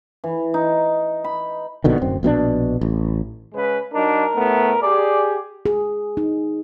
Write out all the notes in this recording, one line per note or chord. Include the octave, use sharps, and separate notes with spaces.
E3
D#4
B5
A#1 B2 D3 D#3
D1 F#2 C4
A#1 B2 D3 D4
A1
C#3 G#3 B4
F#3 D4 D#4 A#4
A2 A3 B3
G4 G#4 D5
G#4
D#4